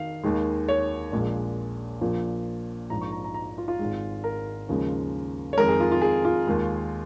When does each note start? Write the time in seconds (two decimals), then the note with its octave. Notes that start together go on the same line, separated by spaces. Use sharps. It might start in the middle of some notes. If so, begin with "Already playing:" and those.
Already playing: D#3 F5
0.23 D#2 D#3 G#3
0.69 C#5
1.12 A#1 A#2 G#3
2.01 A#1 A#2 F3
2.90 A#1 G#2 F3 A#5
3.01 C#6
3.12 A#5
3.24 A#5
3.34 A#5
3.58 F4
3.68 F4
3.79 G#1 G#2 G#3
4.24 A#4
4.69 D#2 C#3 F3 G#3
5.53 C#5
5.57 F2 D#3 G#3 A#4
5.69 G#4
5.80 F4
5.92 F4
6.02 G#4
6.25 F4
6.47 D#2 D#3 G#3